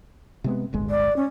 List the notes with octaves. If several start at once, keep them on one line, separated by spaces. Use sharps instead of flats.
C3 G#3 B3
D1 G1 G#3
D5
C#4